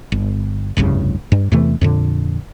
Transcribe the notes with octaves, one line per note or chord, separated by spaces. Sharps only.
G1
F1 C2 G2 C#3
G2
E2 C3 E3 A3
F2 A#2 D3